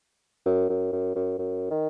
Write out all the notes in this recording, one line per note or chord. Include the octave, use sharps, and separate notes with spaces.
F#2
F#2
F#2
F#2
F#2
D#3